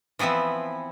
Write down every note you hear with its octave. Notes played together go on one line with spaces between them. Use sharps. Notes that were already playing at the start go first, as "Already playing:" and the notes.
E3 F3 B3 C4 E4